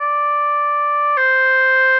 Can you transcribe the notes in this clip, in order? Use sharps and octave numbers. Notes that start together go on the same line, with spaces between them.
D5
C5